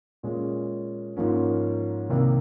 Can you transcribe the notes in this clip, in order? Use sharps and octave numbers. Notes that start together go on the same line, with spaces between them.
A#2 G#3 C#4
G#2 F3 A#3 C#4
C2 C3 D#3 A#3